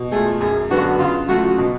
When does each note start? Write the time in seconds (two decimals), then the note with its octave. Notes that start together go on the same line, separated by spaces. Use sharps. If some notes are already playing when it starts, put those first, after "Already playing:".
Already playing: B2
0.12 A3 F4 G#4
0.41 F#2 G#4
0.71 D3 F#3 B3 D4 F#4
0.99 C#3 F4
1.28 F#3 A3 F4 F#4
1.58 B2